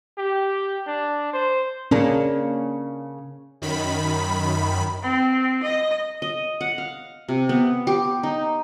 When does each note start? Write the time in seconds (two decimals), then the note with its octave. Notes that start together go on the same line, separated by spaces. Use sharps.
0.18 G4
0.87 D4
1.33 C5
1.91 C#3 A#3 C#4 D4
3.62 F#2 D#3 B5
5.03 C4
5.63 D#5
6.22 D#5
6.61 F#5
6.78 F5
7.29 C3
7.49 B3
7.87 G4
8.23 D#4